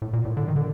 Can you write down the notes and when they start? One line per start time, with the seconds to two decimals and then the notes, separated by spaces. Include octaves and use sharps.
0.02 A2
0.13 A#2
0.25 A2
0.37 D3
0.48 D#3
0.56 D3